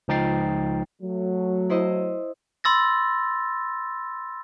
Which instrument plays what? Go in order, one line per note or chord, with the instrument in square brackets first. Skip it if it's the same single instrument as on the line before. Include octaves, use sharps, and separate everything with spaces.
[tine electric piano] C#2 F3 D#4 G5 A6 C7
[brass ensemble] F#3 A3
[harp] E4 C5 D#5
[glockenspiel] B5 C6 E6 A6 A#6